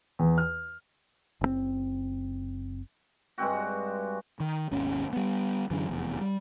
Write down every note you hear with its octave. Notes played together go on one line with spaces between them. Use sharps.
E2
F6
F#1 C#3 C4
G2 G#3 C4 F#4
D#3
G#1 D#2 B2 C#4
G3 B3
F#2 D3 E3
F1 E2
F#3 G3